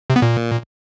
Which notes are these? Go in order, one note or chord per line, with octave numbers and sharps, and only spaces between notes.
C3
B3
A#2